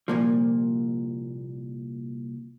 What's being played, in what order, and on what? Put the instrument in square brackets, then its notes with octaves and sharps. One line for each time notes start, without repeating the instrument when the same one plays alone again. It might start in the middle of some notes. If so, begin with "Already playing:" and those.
[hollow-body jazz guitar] C2 A#2 F3